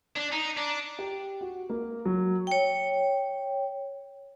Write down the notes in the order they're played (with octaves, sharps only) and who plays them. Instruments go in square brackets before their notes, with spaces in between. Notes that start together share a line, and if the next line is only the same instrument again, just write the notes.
[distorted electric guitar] D4
D#4
D4
[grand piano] G4
F#4
A#3
F#3
[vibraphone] C#5 G5